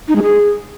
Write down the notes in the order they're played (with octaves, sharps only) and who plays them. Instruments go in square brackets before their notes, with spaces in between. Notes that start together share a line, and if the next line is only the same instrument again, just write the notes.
[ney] D#4
G#3
G#4